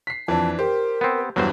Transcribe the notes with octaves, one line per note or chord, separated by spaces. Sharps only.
B6 C7
F2 E3 D4 A5
G4 A#4 C5
B3 C4
E2 G2 E3 F#3 C5